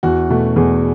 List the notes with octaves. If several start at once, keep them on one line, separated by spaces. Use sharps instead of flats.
E2 F#4
B2 A3
E2 G#4